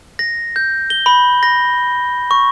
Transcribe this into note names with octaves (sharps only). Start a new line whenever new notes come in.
A#6
G6
G7
B5
A#6
C#6